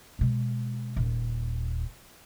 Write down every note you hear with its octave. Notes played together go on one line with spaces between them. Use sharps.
B2 G#3
D#1